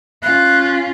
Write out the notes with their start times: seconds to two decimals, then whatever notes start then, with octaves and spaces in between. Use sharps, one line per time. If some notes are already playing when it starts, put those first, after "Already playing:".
0.23 C#4 F4 F#6